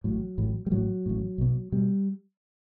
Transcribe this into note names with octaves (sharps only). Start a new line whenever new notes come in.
A1 A2 F#3
A1 A2
G3
A1 A2 F#3
A1 A2
B1 B2
B2 G3